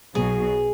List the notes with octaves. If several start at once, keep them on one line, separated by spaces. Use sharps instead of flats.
B1 B2 F#3 G#4